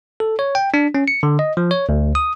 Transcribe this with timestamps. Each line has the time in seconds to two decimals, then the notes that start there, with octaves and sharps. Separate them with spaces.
0.20 A4
0.39 C#5
0.55 G5
0.74 D4
0.95 C#4
1.08 C#7
1.23 D3
1.39 D#5
1.57 F3
1.71 C#5
1.89 D2
2.15 D#6